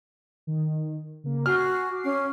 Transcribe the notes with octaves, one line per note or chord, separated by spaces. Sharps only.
D#3
C#3 A#3
F#4 G#5 F6 C7
D6 C7
C#4